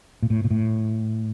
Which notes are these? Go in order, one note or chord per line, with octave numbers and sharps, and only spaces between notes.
A#2
A2
A#2
A2